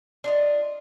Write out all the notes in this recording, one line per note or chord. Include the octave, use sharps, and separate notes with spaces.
D4 F4 D#5